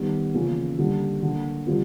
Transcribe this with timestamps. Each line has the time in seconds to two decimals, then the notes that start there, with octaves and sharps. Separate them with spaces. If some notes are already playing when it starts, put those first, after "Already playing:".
Already playing: D#3 G3 B3
0.34 E2 C#3 F3 A#3 C#4
0.79 D3 G3 A#3
1.22 D3 F#3 A#3
1.67 D3 G3 C4 F4